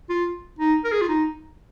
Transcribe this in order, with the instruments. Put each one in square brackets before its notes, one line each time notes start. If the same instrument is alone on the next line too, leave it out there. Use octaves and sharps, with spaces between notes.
[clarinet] F4
D#4
A#4
G#4
F4
D#4